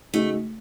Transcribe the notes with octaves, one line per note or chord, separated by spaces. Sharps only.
C#3 G#3 A3 D#4 F#4